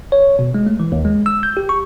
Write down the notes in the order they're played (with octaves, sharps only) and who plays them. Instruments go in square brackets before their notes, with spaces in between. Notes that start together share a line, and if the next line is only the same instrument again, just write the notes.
[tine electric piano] C#5
B2
G#3
A3
E3
D#2
G#3
E6
G6
G4
C#6